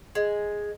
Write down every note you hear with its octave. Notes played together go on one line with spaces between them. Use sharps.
G#3